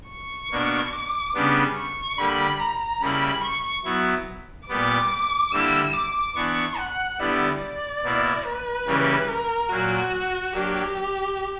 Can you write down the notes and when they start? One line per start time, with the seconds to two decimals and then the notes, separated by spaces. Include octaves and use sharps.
0.09 C#6
0.51 B2 A#3 D4
0.93 D6
1.34 C#3 G3 B3 D4
1.76 C#6
2.18 D3 G3 A#3 B5
2.59 A#5
3.01 C#3 G3 A#3 E4 B5
3.44 C#6
3.85 F#3 B3 E4
4.69 A#2 G3 B3 D6
5.52 D3 G3 A#3 E4 E6
5.94 D6
6.35 E3 B3 D4 C#6
6.78 F#5
7.19 D3 G3 B3 E4 D5
7.61 D5
8.03 B2 A#3 E4
8.45 B4
8.87 C#3 E3 G3 A#3 C#4
9.29 A#4
9.70 A#2 F#3 A#3 F#4
10.53 F#3 A#3 D4 G4